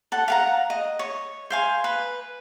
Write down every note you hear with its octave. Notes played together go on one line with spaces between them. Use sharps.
A4 F#5
F5 F#5 A#5
D#5
C#5
C5 F5 G#5
B4